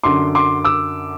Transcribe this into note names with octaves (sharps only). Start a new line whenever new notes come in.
F#2 D3 C6 D6
C6 D6
D6 E6